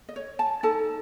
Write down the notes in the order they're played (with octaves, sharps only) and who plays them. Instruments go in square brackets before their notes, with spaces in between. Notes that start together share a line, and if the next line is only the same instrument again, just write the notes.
[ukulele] D#5
C#5
A5
D#4 A4 A5